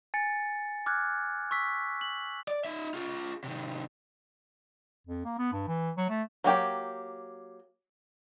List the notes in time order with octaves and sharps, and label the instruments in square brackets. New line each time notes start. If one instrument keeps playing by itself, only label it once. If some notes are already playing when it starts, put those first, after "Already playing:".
[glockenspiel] G#5 A6 C#7
D6 F6 F#6 G#6
C#6 E6 B6
F#7
[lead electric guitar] D5
D#4 E5
F4 G#4
C3 D#3
[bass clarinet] F2
A#3
B3
G2
E3
F#3
A3
[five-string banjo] F#3 A#3 G4 G5